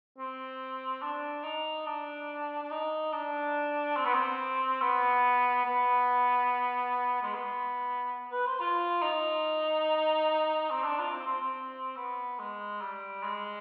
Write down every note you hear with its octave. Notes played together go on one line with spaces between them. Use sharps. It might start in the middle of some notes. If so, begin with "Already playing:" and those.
C4
D4
D#4
D4
D4
D#4
D4
C4
B3
C4
B3
B3
G#3
B3
B4
C5
F4
D#4
C4
D4
F4
C4
C4
C4
B3
G#3
G3
G#3